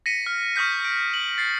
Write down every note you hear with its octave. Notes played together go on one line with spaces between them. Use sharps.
A#6 B6 C#7 D#7
F6
C#6 D#6 F6 G6 B6
D7
F#7
A6 C7